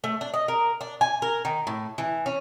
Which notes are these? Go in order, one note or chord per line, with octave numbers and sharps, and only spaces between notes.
A3
D4
D#5
A#4
D4
G#5
A#4
D#3
A2
E3
C#4